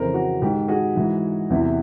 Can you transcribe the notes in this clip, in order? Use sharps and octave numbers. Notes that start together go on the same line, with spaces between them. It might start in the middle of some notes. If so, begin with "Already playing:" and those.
Already playing: F2 C#3 E3 A#4 C5
F#4
G#2 D#3 G4
F#4 G#4
G#2 E3
E2 C3 E3